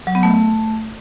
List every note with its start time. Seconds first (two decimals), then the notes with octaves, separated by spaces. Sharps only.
0.07 F#3
0.15 B3
0.23 A3